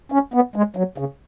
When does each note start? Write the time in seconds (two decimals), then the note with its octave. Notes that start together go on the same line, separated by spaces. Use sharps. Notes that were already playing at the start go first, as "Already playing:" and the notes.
0.12 C#4
0.34 B3
0.56 G#3
0.76 F#3
0.98 C#3